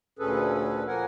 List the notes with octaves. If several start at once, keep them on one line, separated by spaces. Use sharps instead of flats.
D2 A#2 C#4 G#4 A4 B4
A#2 F3 A#3 A#4 F#5 G#5